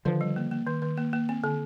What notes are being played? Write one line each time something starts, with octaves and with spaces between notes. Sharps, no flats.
D3 D#3 F3
G3
A#3
A#3
D#3
D#3
A#3
A#3
C4
D3